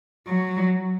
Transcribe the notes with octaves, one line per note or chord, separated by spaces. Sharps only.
F#3